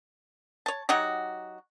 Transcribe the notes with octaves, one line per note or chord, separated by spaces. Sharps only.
C#5 A5
F#3 D#4 F#4 G4